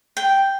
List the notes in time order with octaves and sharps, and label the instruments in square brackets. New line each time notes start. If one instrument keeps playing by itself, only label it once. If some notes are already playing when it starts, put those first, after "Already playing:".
[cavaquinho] G5